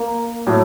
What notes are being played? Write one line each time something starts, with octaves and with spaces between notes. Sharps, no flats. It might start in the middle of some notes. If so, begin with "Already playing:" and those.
Already playing: A#3
A2 F#3 A3